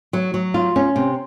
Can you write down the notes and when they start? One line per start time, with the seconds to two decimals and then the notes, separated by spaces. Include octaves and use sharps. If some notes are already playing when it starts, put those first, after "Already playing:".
0.13 F#3
0.34 F#3
0.54 F4
0.76 C#4
0.96 C3